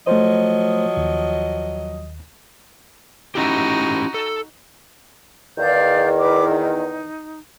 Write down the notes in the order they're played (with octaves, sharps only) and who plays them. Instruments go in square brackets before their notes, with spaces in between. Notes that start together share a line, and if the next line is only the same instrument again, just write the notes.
[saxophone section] F3 F#3 D#5 [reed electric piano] A3 C5
[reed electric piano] D#2
[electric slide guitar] C#4 E4 G4 [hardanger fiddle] D#4 F#4
[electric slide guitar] A4
[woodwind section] E2 D#3 [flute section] D5 F5 G6
[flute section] B4 D6
D#4